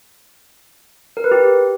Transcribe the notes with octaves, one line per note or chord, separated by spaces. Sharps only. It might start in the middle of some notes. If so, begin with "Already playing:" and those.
A#4
B4
G4